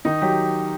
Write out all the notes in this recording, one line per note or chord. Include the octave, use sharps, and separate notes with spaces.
D#3 D#4
F#3 G4